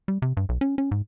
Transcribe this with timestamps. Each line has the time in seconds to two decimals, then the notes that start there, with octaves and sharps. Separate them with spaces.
0.08 G3
0.22 C3
0.37 G2
0.49 B1
0.61 C#4
0.78 C#4
0.91 G#2